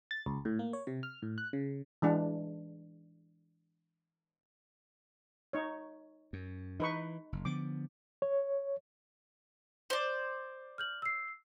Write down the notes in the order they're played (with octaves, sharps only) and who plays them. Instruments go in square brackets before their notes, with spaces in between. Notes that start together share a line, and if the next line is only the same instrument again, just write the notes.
[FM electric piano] A6
C#2
A2
A#3
C#5
C3
F6
A2
F#6
C#3
[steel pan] E3 G#3 D4
D#4 C#5
[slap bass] F#2
[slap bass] E3 [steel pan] D#4 B4 C#6
[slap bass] F#1
[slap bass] D3 F3 B3 [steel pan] D6
[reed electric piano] C#5
[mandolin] C5 D5
[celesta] F6 G6 F#7
E6 C7